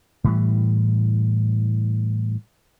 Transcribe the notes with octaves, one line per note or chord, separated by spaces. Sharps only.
A2 E3 G3